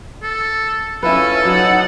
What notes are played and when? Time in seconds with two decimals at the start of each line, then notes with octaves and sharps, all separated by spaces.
0.23 A4
1.03 C#4 E4 F4 A4 B4 G#5
1.45 F#3 D#4 F#5